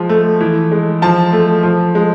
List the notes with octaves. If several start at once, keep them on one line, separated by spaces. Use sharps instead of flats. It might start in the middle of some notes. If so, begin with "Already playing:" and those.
Already playing: F3 G#3
A3
E3
G#3
F3 A5
A3
F3
G#3